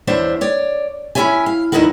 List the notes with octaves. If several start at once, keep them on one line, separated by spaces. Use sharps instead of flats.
E2 D4 C5 C#5 E5 F#5
C#5 D5
C#4 E4 F#4 C#5 E5 G#5
F5
E2 G#3 D#4 E4 A#4 F#5